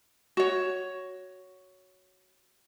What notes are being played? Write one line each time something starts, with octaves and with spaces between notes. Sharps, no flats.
F#4 C#5